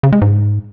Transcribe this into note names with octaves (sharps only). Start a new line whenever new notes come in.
C#3
G#3
G#2